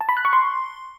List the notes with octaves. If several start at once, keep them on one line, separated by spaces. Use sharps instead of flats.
A5
B5
F#6
C#6
C6